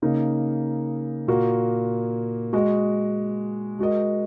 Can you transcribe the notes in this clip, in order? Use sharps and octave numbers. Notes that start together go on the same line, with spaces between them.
C#3 A#3 D#4
A#2 A#3 F#4
G#3 F#4 D#5
G#3 F#4 A#4 D#5